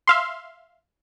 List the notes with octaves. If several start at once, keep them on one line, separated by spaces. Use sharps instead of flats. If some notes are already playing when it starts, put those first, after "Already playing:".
E5 F5 C6